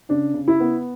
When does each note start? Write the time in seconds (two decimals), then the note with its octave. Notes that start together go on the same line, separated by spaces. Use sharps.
0.09 C#3 D4
0.34 C#3
0.48 E4
0.60 B3